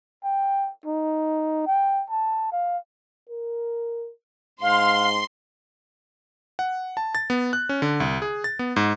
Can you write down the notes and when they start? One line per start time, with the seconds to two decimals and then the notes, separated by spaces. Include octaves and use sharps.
0.23 G5
0.86 D#4
1.66 G5
2.10 A5
2.52 F5
3.29 A#4
4.62 G#2 F5 C6
6.59 F#5
6.97 A5
7.15 A6
7.30 B3
7.53 F#6
7.69 C#4
7.82 D3
8.00 C2
8.22 G#4
8.44 A6
8.59 B3
8.76 G#2